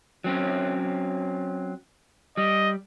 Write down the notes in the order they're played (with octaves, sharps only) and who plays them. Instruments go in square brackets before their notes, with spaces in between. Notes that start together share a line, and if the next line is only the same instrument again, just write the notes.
[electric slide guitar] F#3 C4 C#4
[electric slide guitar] G3 [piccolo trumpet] D#5